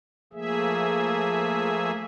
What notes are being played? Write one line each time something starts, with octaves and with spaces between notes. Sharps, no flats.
F3 A3 A#3 G#4 E5